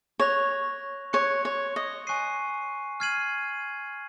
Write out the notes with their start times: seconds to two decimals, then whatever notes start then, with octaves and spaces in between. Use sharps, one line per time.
0.20 C#5 C#6 F#6 A#6 F7
1.13 C#5 C6 F#6 C#7
1.45 C#5
1.76 D#5
2.07 G#5 C#6 F#6 C7 D#7
3.00 F6 G#6 C7 D#7 F#7